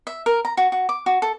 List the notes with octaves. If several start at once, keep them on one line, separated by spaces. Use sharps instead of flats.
E5
A#4
A#5
F#4
F#4
D6
F#4
A4